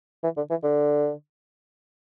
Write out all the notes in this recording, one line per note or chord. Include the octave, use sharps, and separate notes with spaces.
E3
D3
E3
D3